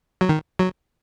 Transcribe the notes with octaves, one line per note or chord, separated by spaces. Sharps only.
F#3
D#3
F#3